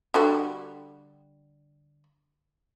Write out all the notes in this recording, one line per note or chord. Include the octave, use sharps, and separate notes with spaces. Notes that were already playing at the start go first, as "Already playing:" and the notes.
D3 G3 F#4